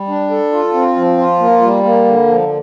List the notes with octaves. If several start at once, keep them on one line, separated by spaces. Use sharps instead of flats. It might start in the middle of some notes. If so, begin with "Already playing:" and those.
Already playing: G3
D4
A4
F4
C4
F3
F4
A#3
G3
A#3
D3
F3